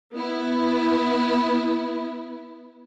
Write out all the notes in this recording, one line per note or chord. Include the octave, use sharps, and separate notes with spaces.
B3 E4